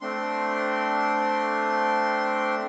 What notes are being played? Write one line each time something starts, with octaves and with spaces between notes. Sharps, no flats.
A3 C4 D4 C6